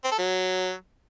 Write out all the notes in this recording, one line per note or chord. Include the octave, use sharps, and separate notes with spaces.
C4
A4
F#3